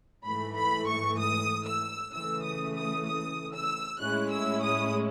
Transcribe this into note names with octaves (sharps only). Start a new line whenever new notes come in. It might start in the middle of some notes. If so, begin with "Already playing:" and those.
G#2 E3 A3 B5
B5
C#6
D#6
E6
C#3 E3 A3 E6
D#6
D#6
D#6
E6
A2 G#3 C#4 E4 F#6
E6
D#6